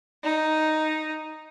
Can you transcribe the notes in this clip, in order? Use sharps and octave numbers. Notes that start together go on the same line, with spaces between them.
D#4